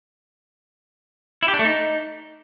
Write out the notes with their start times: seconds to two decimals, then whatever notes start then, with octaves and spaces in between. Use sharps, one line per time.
1.43 E4
1.48 G4
1.54 D4
1.59 A3
1.65 D#4